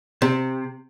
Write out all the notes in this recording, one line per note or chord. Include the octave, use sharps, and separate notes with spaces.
C3